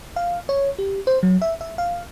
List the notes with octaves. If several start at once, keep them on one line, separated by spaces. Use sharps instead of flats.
F5
C#5
G4
C5
F#3
E5
E5
F5